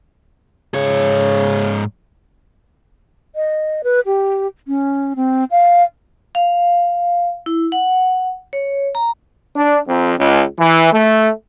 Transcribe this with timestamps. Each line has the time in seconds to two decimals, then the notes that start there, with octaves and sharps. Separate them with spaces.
0.74 G#2 C#3 C#5
3.35 D#5
3.84 B4
4.06 G4
4.68 C#4
5.16 C4
5.51 F5
6.35 F5
7.46 E4
7.72 F#5
8.53 C#5
8.95 A#5
9.56 D4
9.88 F2
10.18 C#2
10.58 E3
10.93 A3